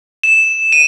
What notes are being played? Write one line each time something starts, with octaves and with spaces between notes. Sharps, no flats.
E7
D#7